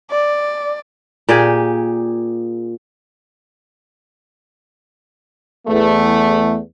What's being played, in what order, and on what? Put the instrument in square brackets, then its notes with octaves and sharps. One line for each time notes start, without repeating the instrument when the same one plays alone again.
[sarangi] D5
[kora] A#2 G4 G#4
[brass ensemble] E2 A3